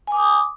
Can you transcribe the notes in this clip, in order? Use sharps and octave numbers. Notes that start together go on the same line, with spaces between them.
G#5 D6 D#6